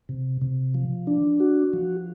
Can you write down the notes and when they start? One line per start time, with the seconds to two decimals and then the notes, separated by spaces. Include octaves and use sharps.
0.09 C3
0.41 C3
0.74 F3
1.07 D4
1.40 F#4
1.73 F3